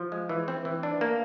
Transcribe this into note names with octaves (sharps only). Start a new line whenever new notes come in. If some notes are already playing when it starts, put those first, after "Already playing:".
Already playing: F3
G#3
E3
C4
E3
D4
A#3